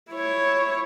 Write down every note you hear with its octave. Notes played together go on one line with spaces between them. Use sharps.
E4 C#5